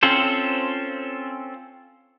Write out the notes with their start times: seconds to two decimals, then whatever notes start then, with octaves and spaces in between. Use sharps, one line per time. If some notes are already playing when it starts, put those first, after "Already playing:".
0.03 C4 C#4 F4 A4 C5